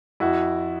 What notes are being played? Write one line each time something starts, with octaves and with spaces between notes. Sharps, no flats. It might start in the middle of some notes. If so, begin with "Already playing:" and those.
F2 E4 F#4